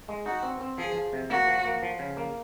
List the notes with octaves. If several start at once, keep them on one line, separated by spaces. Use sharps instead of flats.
G#3
D#4 F#4
C4
C4
F3 G#4
F3
C3
A#3 F#4
F3
A#3
F3
C#3
A#3